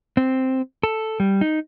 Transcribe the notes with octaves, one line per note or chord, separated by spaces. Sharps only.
C4
A4
G3
D#4